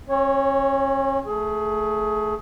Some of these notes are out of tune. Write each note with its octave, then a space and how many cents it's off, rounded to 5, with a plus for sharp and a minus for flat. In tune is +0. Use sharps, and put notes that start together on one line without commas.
C#4 -35 C#5 +0
A3 +0 G#4 +25